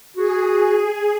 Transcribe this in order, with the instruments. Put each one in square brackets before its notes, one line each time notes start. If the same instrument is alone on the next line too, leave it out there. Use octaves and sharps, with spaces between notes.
[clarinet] F#4 [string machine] G#4